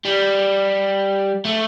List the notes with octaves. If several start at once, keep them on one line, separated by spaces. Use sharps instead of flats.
G3
A3